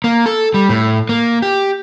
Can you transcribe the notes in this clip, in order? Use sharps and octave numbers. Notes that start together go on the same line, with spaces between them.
A#3
A4
G3
A2
A#3
G4